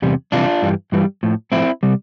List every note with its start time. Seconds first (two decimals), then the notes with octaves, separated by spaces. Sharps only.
0.02 E2 C3 G3
0.32 F2 C3 E3 G3 D4 F4
0.62 G2 E3 G3
0.92 G2 E3 G3
1.23 A2 F3
1.52 A2 F3 C4 E4
1.83 C3 G3